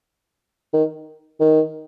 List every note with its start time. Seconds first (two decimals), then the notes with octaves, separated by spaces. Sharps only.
0.74 D#3
1.41 D#3